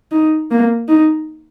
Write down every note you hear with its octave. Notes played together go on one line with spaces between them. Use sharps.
D#4
A#3
D#4